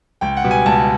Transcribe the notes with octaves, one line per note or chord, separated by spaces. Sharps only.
C#2 G5
F#5
B2 G3
G#5
C#2 A5